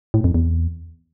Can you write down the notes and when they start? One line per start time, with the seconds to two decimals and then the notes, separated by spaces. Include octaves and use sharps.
0.14 A2
0.24 F2
0.34 E2